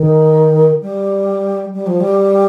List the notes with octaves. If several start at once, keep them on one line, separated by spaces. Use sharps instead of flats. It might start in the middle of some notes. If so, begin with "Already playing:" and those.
Already playing: D#3
G3
G3
F3
G3